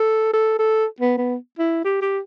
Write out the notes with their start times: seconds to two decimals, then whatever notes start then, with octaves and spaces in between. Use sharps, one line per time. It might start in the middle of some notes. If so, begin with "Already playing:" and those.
Already playing: A4
0.33 A4
0.59 A4
1.00 B3
1.18 B3
1.59 E4
1.84 G4
2.02 G4